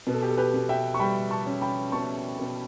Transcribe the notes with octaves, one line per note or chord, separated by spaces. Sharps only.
B2 B4
A4
G4
A4
G4 B4
B2
E5 G5
C#6
G3 G5 B5
A5 C#6
C#4
G5 B5
B2 A5 C#6
B2